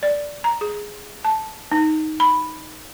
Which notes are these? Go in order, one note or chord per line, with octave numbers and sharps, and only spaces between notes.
D5
A#5
G#4
A5
D#4
B5